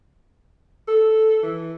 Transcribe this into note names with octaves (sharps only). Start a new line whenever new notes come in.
A4
E3